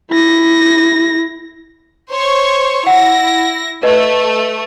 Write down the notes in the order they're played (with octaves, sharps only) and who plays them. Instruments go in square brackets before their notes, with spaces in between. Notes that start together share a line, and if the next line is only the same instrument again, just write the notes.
[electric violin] E4 A#6
[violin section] C5 C#5 C#6
[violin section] E4 A#6 [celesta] F#5
[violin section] A3 [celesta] B4 D#5